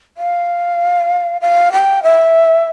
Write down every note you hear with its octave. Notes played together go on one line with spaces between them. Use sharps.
F5
F5
G5
E5